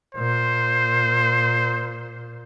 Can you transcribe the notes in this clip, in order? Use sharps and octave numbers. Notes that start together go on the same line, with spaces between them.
A#2 C5